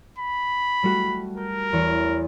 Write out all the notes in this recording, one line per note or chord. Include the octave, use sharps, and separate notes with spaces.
B5
G3 A3 F#4
A#4 G6
E2 C#5